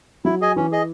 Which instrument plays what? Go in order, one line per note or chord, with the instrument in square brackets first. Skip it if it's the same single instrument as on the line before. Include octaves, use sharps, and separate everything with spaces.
[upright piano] F#3 [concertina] E4
[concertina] G#4 D#5 G#5
[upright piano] E3 [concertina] C#4
[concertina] G#4 D#5